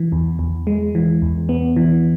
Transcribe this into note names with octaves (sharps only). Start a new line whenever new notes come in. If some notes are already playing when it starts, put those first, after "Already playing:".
Already playing: E3
E2
E2
G#3
E3
E2
B3
E3